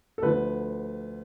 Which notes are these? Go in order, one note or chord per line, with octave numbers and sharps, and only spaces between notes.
A4
D2 D3 F3 B4